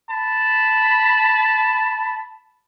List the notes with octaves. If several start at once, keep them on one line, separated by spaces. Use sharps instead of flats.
A5 B5